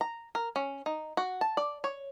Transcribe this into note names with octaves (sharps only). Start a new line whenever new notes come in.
A#5
A#4
C#4
D#4
F#4
A5
D5
C#5